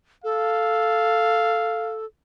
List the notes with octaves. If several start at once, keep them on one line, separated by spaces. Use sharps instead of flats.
A4 F5